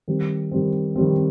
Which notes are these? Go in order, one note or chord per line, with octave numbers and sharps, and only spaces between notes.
D#3 G3 C4
D#3 G3 C4
D#3 G3 C4